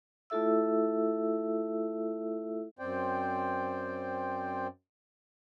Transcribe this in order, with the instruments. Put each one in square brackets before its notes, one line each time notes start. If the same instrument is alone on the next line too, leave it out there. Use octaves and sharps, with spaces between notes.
[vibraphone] A3 E4 F4 A4 E5 E6
[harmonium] F#2 C4 C5 D5 G5